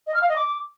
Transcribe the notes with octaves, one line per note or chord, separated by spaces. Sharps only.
D#5
F6
F5
D#5
D6